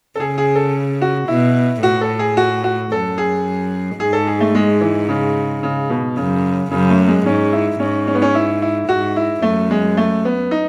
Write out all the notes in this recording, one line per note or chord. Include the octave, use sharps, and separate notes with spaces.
A4
C#3 G#4
G#4
A4
F#4
B2 E4
A2 F#4
A4
G#4
F#4
F#4
F#2 A4
G#4
G#2 G#4
A4
G#4
A3
G#3
E3
C#3
C#3
B2
F#2 C#3
F#2 C#3
A3
G#3
G#2 C#4
E4
G#2 C#4
C#4
B3
C#4
E4
E4
G#2 F#4
E4
F#2 A3
G#3
A3
B3
D#4